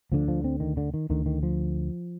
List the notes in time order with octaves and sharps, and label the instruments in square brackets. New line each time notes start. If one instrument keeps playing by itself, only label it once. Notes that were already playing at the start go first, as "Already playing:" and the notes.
[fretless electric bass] D2 D3 F3
F3
C4
D#3
D3
D#3
D2 D3 D#3
D#3
F3